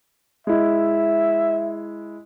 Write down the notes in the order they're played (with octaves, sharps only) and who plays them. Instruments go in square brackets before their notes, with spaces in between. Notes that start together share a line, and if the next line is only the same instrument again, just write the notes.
[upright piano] G#3 E4 [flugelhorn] E5